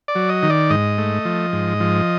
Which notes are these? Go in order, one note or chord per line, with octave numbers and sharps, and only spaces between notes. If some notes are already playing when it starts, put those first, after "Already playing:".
D5
F#3
D#5
D#3
D5
G#2 D#5
A3
F3
G#2
F3